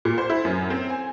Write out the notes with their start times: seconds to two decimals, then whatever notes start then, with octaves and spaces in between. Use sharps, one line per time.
0.05 A#2
0.18 C5
0.30 E4
0.45 F#2
0.70 C4
0.90 G#5